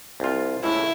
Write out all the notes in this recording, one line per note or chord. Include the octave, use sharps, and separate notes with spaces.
C2 F4
C#2 A2 E4